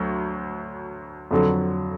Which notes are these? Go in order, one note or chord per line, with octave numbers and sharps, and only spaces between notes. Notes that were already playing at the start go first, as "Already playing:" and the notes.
Already playing: D2 F#3
F2 D3 F#3